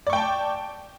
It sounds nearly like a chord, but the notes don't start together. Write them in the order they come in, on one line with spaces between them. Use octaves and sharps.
D5 C#6 G5 A5